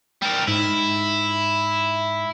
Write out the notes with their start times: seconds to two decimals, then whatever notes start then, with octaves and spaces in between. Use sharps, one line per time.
0.22 G3 A#4
0.48 G#2 E4